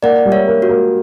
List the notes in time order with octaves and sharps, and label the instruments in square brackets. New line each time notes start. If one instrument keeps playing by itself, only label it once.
[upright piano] A#3 [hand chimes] D5 F#5
[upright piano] G3
[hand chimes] C#5 E5
[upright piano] A#3
[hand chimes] F#4
[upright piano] A#3